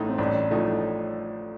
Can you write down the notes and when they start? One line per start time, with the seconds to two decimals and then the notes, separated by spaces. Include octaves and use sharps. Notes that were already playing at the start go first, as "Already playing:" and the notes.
Already playing: A1 A2 A3 D#4
0.09 C4
0.18 A1 D4
0.51 A2 F3 A3 D#4